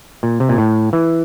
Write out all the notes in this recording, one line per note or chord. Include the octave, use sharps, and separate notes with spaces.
A#2
C3
A#2
A2
E3